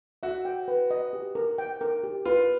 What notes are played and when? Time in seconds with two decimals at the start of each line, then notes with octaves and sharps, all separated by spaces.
0.23 F#4 E5
0.45 G5
0.68 B4
0.91 D#5
1.13 G4
1.35 A#4
1.58 G5
1.81 A#4
2.04 G4
2.25 F4 B4